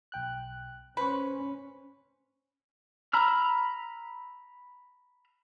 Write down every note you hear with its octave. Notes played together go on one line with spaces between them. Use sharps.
B1 G5 F#6
C#4 B4 C5 C#6
A#5 B5 E6 F6